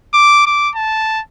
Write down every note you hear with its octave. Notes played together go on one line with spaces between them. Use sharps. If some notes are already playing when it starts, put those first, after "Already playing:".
D6
D6
A5